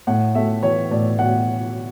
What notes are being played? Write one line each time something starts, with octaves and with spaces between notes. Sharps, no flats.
A2 F#5
A3 E5
E3 C#5
A2 D5
A2 F#5